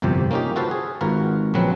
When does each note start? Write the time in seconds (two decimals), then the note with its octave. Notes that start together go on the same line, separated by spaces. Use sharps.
0.02 G1 C2 F2 C3 G4 C5
0.31 A#3 C#4 D#4 F4 G4
0.56 F4 F#4 A4 B4 C5 F5
0.71 G#4
1.01 G#1 G#2 F4 F#4 A#4 B4
1.54 A#1 C#3 F#3 C4 B4